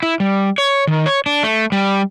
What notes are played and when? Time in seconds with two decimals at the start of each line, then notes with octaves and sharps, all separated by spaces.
0.03 E4
0.20 G3
0.58 C#5
0.87 D#3
1.06 C#5
1.26 D4
1.43 A3
1.72 G3